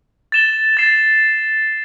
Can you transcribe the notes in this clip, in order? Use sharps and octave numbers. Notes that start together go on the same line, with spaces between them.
A6 E7 G7
A6 C7 E7